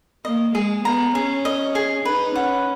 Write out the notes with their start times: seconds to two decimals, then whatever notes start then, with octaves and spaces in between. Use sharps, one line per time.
0.25 A#3 D#5
0.55 G#3 G#4
0.84 B3 A#5
1.15 C#4 G#4
1.45 D#5
1.75 G#4
2.05 D#4 B4
2.35 C#4 F#5